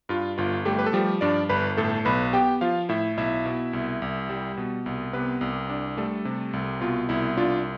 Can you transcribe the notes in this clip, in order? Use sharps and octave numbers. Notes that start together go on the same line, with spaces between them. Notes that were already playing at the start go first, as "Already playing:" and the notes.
G2 F4
G1 F4
G3 A3 G4
B4
A4
F3 G3 G4
G2 D4 D5
G1 B4 B5
A2 A4 A5
B1 B4 B5
B3 G4 G5
F3 F4 F5
A2 E4 E5
B1 E4 E5
B2
C2
C2
G3
B2
C2
C3 B3 B4
C2
D4
G3 A3 A4
C3
C2
B2 F4
C2 E4
D4 F4